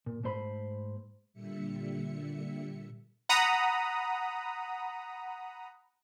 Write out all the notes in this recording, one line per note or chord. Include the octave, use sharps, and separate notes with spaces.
A#2
G#2 A3 C5 B5
A#2 D3 G3 E5 C#7
F#5 A#5 B5 D#6